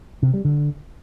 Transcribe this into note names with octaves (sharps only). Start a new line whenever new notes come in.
C3
G3
D3